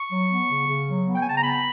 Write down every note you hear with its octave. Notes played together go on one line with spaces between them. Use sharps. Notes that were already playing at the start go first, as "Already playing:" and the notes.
Already playing: C#6
F#3
B3
C#3
C#3
F#3
B3
G5
C#3 G#5
A5
A#5
B3 B5